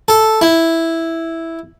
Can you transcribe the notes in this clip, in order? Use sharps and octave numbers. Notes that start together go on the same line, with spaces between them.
A4
E4